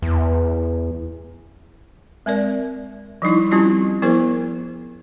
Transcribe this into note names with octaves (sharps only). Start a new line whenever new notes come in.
E2
G#3 C4 A#4 D5
F3 G3 D#4 E4
G3 C4 C#4 E4 F4 G4
F3 B3 E4 G#4 A#4 C5